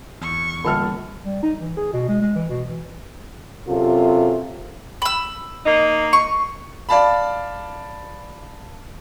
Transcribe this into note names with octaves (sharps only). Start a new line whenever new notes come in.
E2 C#6
D#1 D3 G3 A5 F6
G3
D#4
E3
G#4
B2
G#3
G#3
E3
B2
E3
F#2 C3 F4 G4 A4
B5 E6
A#3 D#4
C#6
D5 F5 A5 B5